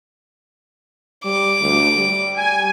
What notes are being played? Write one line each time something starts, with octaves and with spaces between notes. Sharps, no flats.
G3 D6
D2
G3
G#5